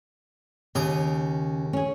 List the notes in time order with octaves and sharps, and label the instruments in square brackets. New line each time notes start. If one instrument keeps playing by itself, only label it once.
[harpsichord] D#2 A#5 D#6 [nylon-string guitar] C#3
[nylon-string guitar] C#4 G#4